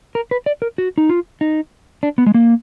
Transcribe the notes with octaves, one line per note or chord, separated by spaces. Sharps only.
A#4
B4
D5
A#4
F#4
D#4
F4
D#4
D4
B3
G#3
A#3